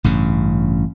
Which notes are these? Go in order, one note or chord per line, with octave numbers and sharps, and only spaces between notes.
A1 G2 C#3